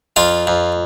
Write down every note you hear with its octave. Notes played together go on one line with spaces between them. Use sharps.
F2 F4 F5
F2